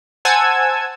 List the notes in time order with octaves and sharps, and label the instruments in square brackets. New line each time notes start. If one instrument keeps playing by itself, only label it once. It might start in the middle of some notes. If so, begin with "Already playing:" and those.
[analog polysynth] C5 F#5 G#5 A5 E6 G#6